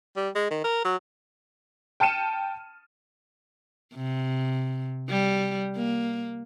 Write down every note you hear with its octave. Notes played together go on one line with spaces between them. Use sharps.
G3
G#3
D#3
A#4
F#3
G5 A5 F6 C#7 D#7 E7
C3
G3
A#3